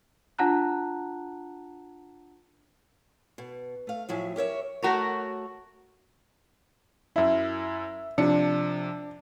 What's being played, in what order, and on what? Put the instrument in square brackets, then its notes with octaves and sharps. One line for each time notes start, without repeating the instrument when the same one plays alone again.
[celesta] D4 F4 F#5 A5 A#5 F#6
[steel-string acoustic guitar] B2
A3 F5
A2 F3 F#3 E5 G#5
G4 A#4 C#5 E5
[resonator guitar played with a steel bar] A3 F#4 A#4 C#5
[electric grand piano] F#2 E4 [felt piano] E5
[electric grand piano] C3 F3 C#7 [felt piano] D4